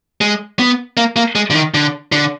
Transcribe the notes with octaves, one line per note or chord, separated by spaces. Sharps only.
G#3
B3
A#3
A#3
G#3
D3
D#3
D3
D3